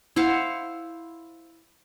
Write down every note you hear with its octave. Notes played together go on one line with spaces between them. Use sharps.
E4 C5 F5 F#5